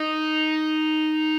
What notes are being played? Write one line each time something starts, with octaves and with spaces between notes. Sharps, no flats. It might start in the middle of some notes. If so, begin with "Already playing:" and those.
Already playing: D#4